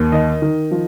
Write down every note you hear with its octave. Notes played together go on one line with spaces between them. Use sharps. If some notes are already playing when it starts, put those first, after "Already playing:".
Already playing: D#2
D#3 D#5
D#3
F3